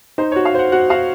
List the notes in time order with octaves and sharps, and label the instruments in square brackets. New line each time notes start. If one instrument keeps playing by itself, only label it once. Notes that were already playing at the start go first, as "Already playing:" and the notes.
[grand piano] D#4 [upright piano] C5
[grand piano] F#4 [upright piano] C#5
[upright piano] F5
[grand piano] C5 [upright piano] F#5
[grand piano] F#4 [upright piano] F#5
[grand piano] F#4 [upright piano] F5